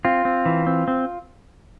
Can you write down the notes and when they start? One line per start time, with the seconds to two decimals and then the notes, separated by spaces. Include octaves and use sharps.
0.05 C4 F4
0.25 C4
0.46 E3
0.67 C4
0.88 C4